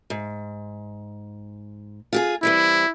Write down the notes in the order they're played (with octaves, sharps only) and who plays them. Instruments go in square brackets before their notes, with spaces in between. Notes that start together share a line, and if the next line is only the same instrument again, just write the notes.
[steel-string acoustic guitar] G#2
F4 G4 G#4
[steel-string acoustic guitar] E3 G3 C4 [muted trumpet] E4